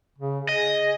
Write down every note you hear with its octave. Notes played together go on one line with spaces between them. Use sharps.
C#3
G#4 D#5